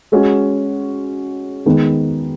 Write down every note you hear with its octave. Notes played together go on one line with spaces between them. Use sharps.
G#3 C#4 F#4
D#3 G#3 B3 D#4